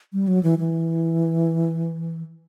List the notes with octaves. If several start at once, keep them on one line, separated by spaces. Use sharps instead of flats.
G3
F#3
E3
E3